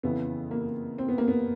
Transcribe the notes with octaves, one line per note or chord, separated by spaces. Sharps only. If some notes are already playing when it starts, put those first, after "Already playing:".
F2 C#3 E3 B3
A#3
C4
B3
A#3
B3